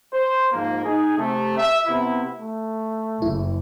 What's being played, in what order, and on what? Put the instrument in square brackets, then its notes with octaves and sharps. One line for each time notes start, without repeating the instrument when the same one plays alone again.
[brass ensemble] C5
G#2 F3 A#3
D#4 G#4
C3 A3
E5
C3 B3 E4
[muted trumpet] A3
[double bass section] F#1 [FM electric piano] E4